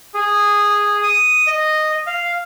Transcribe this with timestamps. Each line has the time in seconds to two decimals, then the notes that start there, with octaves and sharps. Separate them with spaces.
0.14 G#4
1.03 D#6
1.47 D#5
2.07 F5